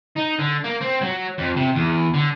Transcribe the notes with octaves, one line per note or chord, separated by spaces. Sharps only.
D#4
D3
A#3
C4
F#3
F2
C3
E2
D3